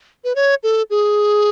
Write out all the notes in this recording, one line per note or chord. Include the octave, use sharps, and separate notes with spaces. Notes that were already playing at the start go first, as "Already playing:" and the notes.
B4
C#5
A4
G#4